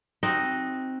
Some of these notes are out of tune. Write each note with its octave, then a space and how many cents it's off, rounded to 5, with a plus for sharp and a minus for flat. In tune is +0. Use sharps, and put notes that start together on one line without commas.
C4 +0 D#4 +0 F#4 +0